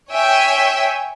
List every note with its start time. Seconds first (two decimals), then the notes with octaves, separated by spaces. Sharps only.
0.13 C#5 E5 G5 G#5